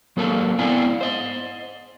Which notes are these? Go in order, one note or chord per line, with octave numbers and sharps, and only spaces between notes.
F#3 A#3 A4 A#4 A5
B3 C4 D4 E4 F5 G#5
C5 D#5